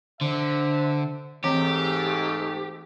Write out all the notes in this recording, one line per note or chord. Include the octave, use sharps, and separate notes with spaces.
D3 D4 C5 E5
G#2 E3 A3 C4 G4 G5